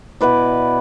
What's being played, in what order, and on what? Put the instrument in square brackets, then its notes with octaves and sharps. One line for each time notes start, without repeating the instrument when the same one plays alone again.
[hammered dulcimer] B2 E4 B4 D5